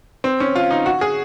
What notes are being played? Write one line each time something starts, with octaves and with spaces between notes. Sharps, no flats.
C4
C#4
F4
D#4
F#4
G#4